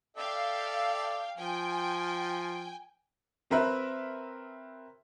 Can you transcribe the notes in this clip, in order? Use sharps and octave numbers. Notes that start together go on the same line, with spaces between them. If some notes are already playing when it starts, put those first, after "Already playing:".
A4 D5 E5 F5 G5
F3 G5 G#5
F#3 C4 A#4 B4 E5 F#6